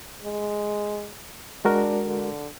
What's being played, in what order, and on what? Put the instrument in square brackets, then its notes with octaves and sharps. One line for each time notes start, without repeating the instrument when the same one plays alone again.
[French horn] G#3
[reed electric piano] G#3 F#4 A#4 [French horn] D4
[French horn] D3